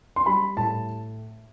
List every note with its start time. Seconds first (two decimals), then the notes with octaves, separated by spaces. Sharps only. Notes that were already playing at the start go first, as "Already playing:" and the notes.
0.16 C6
0.26 G3 B5
0.57 A2 A5